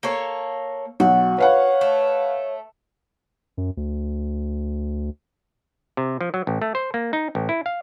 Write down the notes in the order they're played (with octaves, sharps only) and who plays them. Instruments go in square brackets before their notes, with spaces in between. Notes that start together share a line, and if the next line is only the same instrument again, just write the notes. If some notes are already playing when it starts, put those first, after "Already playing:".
[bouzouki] A#3 A4 C#5
[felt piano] B1 [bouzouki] F#4
[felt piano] B4 F5 F#5 [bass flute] C#5
[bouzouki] A3
[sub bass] F#2
D2
[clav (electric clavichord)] C3
F3
F#3
A1
A3
C5
A#3
D#4
A1
E4
F5